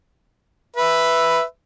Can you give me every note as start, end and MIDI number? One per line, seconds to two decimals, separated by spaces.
0.76 1.43 71
0.76 1.43 76